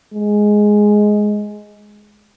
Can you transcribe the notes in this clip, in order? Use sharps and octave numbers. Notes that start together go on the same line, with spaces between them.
G#3